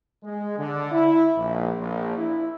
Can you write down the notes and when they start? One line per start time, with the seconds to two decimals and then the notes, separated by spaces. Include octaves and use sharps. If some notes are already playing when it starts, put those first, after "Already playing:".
0.23 G#3
0.57 D3
0.91 E4
1.35 A#1
1.77 A#1
2.16 E4